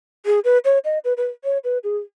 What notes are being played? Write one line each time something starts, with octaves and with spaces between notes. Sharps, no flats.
G#4
B4
C#5
D#5
B4
B4
C#5
B4
G#4